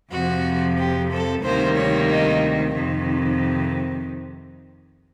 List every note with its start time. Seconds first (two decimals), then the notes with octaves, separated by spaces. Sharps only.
0.11 F2 C3 F3 F#4
0.78 G4
1.11 A4
1.43 D2 C3 D#3 G3 A#3 C5
1.76 C#5
2.10 D#5
2.75 F2 C3 D#3